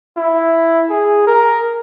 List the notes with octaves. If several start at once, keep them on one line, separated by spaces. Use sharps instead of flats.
E4
G#4
A#4